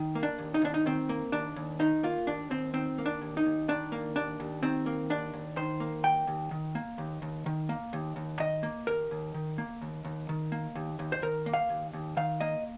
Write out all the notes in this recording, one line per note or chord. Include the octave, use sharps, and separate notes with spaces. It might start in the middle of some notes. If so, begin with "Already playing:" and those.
Already playing: D#3
A#3
D4
D#2
D#4
D#2 D4
D#4
D#3 C4
A#3
D#2 D4
D#2
D#3 D#4
A#3 F4
D#2 D4
D#2 C4
D#3 C4
A#3
D4
D#2
D#4
D#2
D#3 D4
A#3
D#2 D4
D#2
D#3 C4
A#3
D#2 D4
D#2
D#3 C5
A#3
D#2 G5
D#2
D#3
A#3
D#2
D#2
D#3
A#3
D#2
D#2
D#3 D#5
A#3
D#2 A#4
D#2
D#3
A#3
D#2
D#2
D#3
A#3
D#2
D#2
C5
D#3 A#4
A#3
F5
D#2
D#2
D#3 F5
A#3 D#5